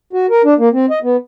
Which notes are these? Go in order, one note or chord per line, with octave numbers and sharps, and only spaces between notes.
F#4
A#4
D4
A#3
C4
D#5
B3